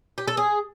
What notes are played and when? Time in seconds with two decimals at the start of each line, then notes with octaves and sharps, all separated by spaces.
0.18 G4
0.28 A4
0.37 G#4